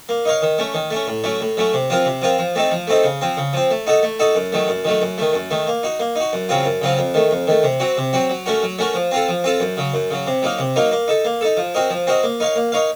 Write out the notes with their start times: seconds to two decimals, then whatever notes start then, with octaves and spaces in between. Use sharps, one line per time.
0.09 A#3
0.25 D#4 A#4 C#5 F5
0.42 D#3
0.58 A3 C#4
0.74 D#3
0.90 A3 C#4
1.07 A2
1.24 F#3 A3 C#4
1.41 A2
1.57 F#3 A3 C#4
1.73 C3
1.90 F3 C4 F4 A#4
2.05 C3
2.22 F3 C4 F4 A#4
2.39 F3
2.55 A3 C4 D#4 A4
2.72 F3
2.87 A3 C4 D#4 A4
3.04 C#3
3.21 F3 C4
3.37 C#3
3.53 F3 C4
3.71 A3
3.87 D#4 F#4 A4 D#5
4.03 A3
4.19 D#4 F#4 A4 D#5
4.35 F#2
4.52 D#3 F#3 A3
4.68 F#2
4.85 D#3 F#3 A3
5.02 F#2
5.18 D#3 A3
5.33 F#2
5.51 D#3 A3
5.67 A#3
5.83 D#4 F#4
6.00 A#3
6.16 D#4 F#4
6.33 F#2
6.49 C#3 F#3 C4 F4
6.65 F#2
6.82 C#3 F#3 C4 F4
6.99 F2
7.14 D#3 A3
7.31 F2
7.47 D#3 A3
7.63 C3
7.80 F#3 C4 F#4
7.97 C3
8.13 F#3 C4 F#4
8.30 F#3
8.46 A3 C#4 F#4 A#4
8.63 F#3
8.79 A3 C#4 F#4 A#4
8.94 F3
9.11 C4 F4 A4
9.28 F3
9.44 C4 F4 A4
9.60 F#2
9.77 C#3 F#3
9.94 F#2
10.11 C#3 F#3
10.27 C3
10.42 F#3 A#3 D#4 A#4
10.59 C3
10.76 F#3 A#3 D#4 A#4
10.92 A#3
11.08 D#4 A4
11.25 A#3
11.41 D#4 A4
11.57 F3
11.75 C4 F#4 A#4 D#5
11.90 F3
12.07 C4 F#4 A#4 D#5
12.23 A#3
12.40 D#4 A#4 C#5 F5
12.56 A#3
12.72 D#4 A#4 C#5 F5